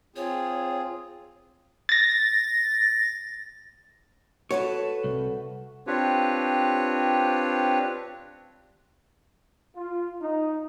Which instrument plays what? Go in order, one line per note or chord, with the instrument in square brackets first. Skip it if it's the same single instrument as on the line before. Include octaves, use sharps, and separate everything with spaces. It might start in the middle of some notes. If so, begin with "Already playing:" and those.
[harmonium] C4 F4 G#4 [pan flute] C#5
[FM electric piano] A6 A#6
[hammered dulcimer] F#4 [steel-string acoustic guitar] A4 B4 A5 [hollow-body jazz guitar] C#5
[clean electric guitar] C2
[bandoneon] C4 D4 F4 G4 B4 C#5
[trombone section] F4
D#4